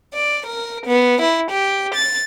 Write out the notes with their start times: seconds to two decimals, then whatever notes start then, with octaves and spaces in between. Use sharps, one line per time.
0.14 D5
0.46 A#4
0.84 B3
1.21 E4
1.50 G4
1.93 A6